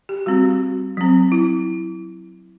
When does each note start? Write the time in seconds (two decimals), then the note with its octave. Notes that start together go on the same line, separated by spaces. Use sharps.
0.09 G4
0.26 G3 C4 F#4
0.45 F#4
0.97 F#3 C4
1.32 E4